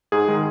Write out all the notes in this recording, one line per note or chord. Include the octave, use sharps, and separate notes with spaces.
G#2 G#4
D#3 G#3